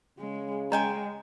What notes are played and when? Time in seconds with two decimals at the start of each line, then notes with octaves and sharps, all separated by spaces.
0.19 C#3 G#3
0.72 G#3 C#4 D#5 G5 G#5 A#5